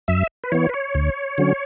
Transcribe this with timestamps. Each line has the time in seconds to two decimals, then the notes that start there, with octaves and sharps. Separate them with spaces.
0.08 F#2 E5
0.44 B4
0.52 E3 B3 C#5
0.69 B4
0.74 C#5
0.95 D2
1.38 D3 F#3 C#4